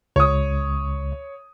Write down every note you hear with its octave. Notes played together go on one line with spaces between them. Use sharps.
C#2 C#5 D#6